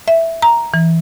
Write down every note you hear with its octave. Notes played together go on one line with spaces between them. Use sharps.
E5
A#5
E3